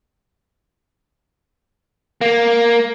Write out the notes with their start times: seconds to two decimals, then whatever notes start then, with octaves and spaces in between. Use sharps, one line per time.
2.21 A#3